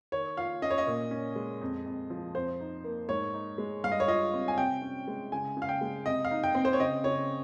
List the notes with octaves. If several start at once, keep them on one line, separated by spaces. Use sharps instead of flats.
D#3 C#5
F4 F5
C#4 D#5
C#5
D#5
A#2
C#4
G#3
F2
F2
F3
F2 C5
D#4
A#3
G#2 C#5
D#4
G#3
G2 F5
D#5
C#5
F4 D#5
C4
G#5
C3 G5
C#4
G#3
C#3 G#5
C#3
F5
G5
G#3
C3 D#5
F5
D#4
G5
C4
C5
C#5
C#3 D#5
C#3 C#5